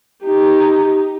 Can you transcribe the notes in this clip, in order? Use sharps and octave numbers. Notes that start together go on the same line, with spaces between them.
D#4 G4